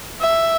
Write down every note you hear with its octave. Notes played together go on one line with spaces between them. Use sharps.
E5